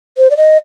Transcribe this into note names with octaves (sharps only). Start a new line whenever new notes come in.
C5
D5
D#5